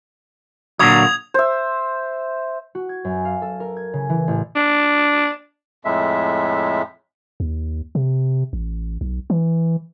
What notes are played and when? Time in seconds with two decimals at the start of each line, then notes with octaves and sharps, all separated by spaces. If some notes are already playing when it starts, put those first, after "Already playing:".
0.79 A#2 D3 F#3 D#6 G#6 F7
1.34 C5 E5
2.75 F#4
2.89 G#6
3.04 F#2
3.25 F5
3.42 A4
3.60 A#4
3.77 G#6
3.93 C#3
4.09 E3
4.28 A1
4.55 D4
5.85 F2 A2 G#3 E5
7.40 D#2
7.95 C3
8.53 A1
9.01 B1
9.30 E3